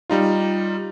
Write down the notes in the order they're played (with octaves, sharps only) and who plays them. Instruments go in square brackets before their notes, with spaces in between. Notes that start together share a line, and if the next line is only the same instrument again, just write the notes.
[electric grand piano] G3 D#4 F4